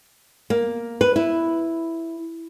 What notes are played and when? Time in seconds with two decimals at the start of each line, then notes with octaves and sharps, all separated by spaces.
0.50 A#3
1.01 B4
1.16 E4